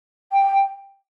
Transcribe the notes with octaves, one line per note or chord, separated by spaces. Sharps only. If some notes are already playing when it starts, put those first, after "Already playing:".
G5